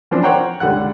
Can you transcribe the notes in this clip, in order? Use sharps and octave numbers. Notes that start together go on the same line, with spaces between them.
E3 F3 C4 D4
A#4 C5 C#5 F#5 G5 A#5
C#2 D3 G3 F#5 F#6